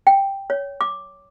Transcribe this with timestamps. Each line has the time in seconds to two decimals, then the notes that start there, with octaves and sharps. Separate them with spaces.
0.07 G5
0.50 C#5
0.81 D6